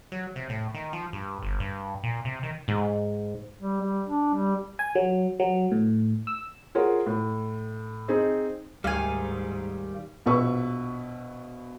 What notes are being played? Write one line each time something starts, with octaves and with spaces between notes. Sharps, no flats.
F#3
C3
A2
D#3
F3
G2
G1
G2
A#2
C3
D#3
G#2
G3
G3
D4
G3
G#5
F#3
F#3
A2
E6
F4 G#4 A#4 C#5 F#5
A2
C4 D#4 G#4
D2 G#2 D#3 G3 F5 G#5
A#1 B2 B4 C#6 E6